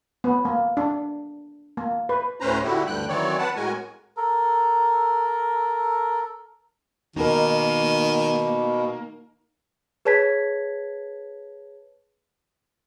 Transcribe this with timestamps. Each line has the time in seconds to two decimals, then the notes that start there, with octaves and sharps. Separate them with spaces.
0.24 B3
0.45 A#3
0.77 D4
1.77 A#3
2.09 B4
2.40 D2 A2 C#4 B4 C5 A#5
2.64 A#2 D3 E4 F#4 G4
2.87 D2 G2 D3 G3 G5 F#6
3.09 D#3 E3 F#3 C4 C#5 D5
3.39 B4 F#5 A5
3.56 A2 G#3 F#4 A#4 G#5
4.17 A4 A#4
7.16 B2 D#3 A#3 D#4 A#4
10.05 G#4 B4 C#5 A5 G#6 B6